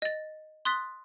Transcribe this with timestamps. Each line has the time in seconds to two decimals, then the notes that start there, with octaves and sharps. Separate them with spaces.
0.02 D#5 A6
0.65 C6 D#6 F#6 A6 B6 G7